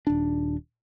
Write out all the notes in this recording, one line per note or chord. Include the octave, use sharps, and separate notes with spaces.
D#1 D4